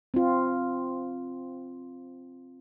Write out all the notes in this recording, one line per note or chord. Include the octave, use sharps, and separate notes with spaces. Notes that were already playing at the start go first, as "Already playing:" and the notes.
C4 F4